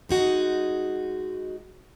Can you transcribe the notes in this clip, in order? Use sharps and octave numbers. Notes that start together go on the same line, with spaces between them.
G#3 D#4 F#4